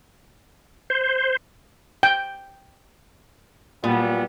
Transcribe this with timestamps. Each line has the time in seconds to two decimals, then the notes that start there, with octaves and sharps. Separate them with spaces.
0.90 C5
2.03 G5
3.84 A#2 F#3 G3 B3